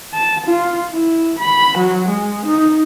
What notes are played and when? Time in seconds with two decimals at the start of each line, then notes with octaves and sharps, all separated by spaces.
0.14 A5
0.47 F4
0.91 E4
1.39 B5
1.78 F#3
2.09 G#3
2.46 D#4